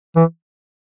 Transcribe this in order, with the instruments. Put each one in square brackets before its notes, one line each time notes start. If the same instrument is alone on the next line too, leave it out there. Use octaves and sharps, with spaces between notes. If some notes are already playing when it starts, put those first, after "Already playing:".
[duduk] E3